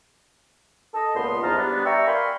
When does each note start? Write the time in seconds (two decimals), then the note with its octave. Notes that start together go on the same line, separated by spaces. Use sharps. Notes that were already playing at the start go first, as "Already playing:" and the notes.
0.94 A4 D#5
1.15 C#2 A#2 B3 C6
1.42 E2 F3 D#4 A5 A#5 F6
1.57 G3 B3 D4
1.85 D5 E5 G5 A#5 C#6 E6
2.06 A#4 D5 F5 G#5 B5 C6